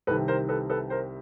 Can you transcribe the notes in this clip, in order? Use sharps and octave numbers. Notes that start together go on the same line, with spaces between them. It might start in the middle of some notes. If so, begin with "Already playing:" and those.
C2 C3 D#3 A4 B4
A#4 C5
A4 B4
A4 B4
A#4 C5